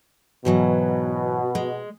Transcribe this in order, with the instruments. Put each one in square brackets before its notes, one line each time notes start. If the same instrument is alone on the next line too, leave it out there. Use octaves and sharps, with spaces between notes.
[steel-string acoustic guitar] G#2 E3 F#3 [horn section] B2
[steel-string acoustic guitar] G#3